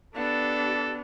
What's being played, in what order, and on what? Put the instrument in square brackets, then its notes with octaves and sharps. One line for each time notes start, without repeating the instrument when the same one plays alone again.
[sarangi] B3 [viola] D4 G4 [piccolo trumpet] A4